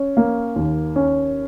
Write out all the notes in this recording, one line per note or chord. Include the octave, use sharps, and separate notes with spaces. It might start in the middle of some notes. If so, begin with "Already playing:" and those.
Already playing: C#4
A#3
D#2
C#4